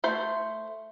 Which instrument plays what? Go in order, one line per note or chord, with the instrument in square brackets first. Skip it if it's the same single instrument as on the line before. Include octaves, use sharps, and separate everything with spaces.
[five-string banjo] A3 C5